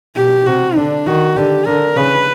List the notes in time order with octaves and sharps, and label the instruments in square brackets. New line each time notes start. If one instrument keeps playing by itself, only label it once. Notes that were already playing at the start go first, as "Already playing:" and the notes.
[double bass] B2 [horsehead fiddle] G4
[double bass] C3 [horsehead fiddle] F#4
[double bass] D3 [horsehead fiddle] D4
[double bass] D#3 [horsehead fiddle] F#4
[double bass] D3 [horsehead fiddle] G4
[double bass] D3 [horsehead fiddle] A#4
[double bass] C#3 [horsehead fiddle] B4